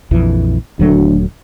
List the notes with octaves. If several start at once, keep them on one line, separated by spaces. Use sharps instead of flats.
A#1 F2 E3
D#1 D2 F#3 A3